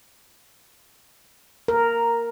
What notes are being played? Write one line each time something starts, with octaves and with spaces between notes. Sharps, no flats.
A#4